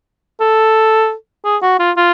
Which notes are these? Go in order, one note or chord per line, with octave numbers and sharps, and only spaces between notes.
A4
G#4
F#4
F4
F4